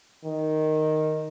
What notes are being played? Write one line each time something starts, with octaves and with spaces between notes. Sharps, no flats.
D#3